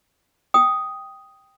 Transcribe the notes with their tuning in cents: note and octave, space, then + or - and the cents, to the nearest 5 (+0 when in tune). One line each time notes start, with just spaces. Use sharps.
G5 +0 D#6 +0